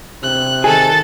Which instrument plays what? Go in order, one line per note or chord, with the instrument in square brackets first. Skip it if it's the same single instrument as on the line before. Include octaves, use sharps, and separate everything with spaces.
[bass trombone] C3 [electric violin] F#6
[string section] D#3 A4 A6 [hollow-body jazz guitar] G#4